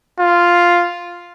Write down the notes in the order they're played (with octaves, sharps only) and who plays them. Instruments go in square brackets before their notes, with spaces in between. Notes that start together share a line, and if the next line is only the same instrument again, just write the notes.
[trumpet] F4